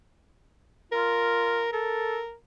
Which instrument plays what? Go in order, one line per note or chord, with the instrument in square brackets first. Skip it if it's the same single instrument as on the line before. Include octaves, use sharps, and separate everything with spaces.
[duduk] F4 [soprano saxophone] A#4
[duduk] A4 [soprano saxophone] A#4